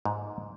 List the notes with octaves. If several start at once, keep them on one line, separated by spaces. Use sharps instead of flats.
G#2